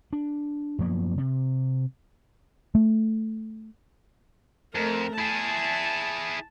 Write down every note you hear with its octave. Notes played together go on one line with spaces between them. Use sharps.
D4
F#2 F3 A#3 B3
C3
A3
F2 A3 A#4
E4 G#4 A5